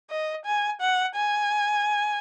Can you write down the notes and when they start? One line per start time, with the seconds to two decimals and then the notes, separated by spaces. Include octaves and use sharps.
0.10 D#5
0.46 G#5
0.81 F#5
1.15 G#5